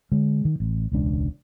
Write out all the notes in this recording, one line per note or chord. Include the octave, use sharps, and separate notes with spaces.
D3 G#3
D#3
A1
E1 C#2 D4